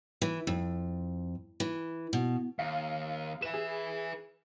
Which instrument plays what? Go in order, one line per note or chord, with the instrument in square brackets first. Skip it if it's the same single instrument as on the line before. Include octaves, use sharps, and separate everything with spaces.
[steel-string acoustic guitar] E3
F2
E3
B2
[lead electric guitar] D#2 [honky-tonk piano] F5
[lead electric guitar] B4 E5 [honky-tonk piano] E7
[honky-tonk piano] G#4